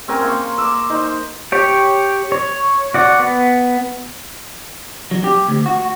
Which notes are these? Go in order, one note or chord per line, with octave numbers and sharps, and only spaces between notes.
C4 C#4 A#4 G#5
A#3 C6 C#6
D6 E6
D#4 C5
G4 C#5 G5
C#5
F#4 D5 F#5
B3
F#3
G4
D2
F#4